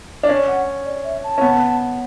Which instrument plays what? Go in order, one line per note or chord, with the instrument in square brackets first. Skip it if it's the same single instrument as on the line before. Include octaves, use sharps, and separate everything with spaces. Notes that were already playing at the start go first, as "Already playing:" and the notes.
[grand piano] D4
C#4
[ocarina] F#5
D5
E5
A5
[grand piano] C#4
B3